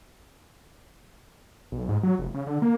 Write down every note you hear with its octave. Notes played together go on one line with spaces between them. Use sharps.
B1
G#2
F#3
F1
C#3
D3
A#3